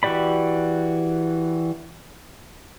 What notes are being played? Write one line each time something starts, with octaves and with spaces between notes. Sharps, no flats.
E3 F#4 G4 D5 B5